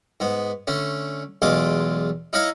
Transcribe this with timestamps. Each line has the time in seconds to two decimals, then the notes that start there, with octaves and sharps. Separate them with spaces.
0.20 G#2 B3
0.67 D3 A3 C#4
1.42 B1 E2 G#3 A3 F4 D6
2.33 D#4 E4 C#5 D#5 F5 A#5